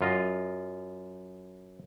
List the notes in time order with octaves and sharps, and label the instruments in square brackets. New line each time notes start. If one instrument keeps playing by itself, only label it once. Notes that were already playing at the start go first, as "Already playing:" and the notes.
[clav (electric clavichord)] F#2 F4 D#5